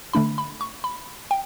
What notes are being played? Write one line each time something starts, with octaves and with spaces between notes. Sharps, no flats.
D3 A3 D4 B5
B5
C#6
B5
G5